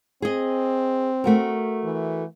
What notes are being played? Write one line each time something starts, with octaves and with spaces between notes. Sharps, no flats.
C4 G#4 D#5
A3 F#4 A#4
E3